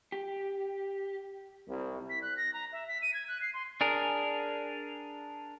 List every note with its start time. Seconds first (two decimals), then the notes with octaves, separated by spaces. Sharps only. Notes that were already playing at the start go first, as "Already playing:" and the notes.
0.12 G4
1.68 C2
2.10 B6
2.22 F#6
2.37 A#6
2.54 A#5
2.72 E5
2.88 B6
3.02 D#7
3.14 G#6
3.28 F#6
3.41 C7
3.54 C6
3.81 D4 G#4 A#4